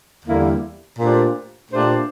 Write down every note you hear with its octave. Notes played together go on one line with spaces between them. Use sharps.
E2 D3 G3 A#3 E4
A#2 A3 D4 G4 C5
A#2 A3 D4 G4 C5